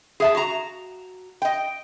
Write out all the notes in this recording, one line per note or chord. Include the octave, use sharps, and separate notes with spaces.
G#4 E5 A5
F#4 A#5
D#5 G5